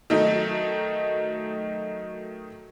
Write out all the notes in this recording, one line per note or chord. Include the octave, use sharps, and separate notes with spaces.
D#3 F#3 A3 D#4